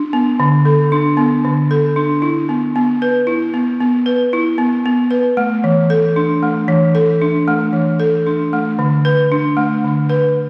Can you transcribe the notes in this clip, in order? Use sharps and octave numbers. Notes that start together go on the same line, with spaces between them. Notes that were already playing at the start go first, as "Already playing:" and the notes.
Already playing: D4
B3
D3
A4
D4
B3
D3
A4
D4
E4
B3
B3
B4
E4
B3
B3
B4
E4
B3
B3
B4
A3
E3
A4
D4
A3
E3
A4
D4
A3
E3
A4
D4
A3
D3
B4
D4
A3
D3
B4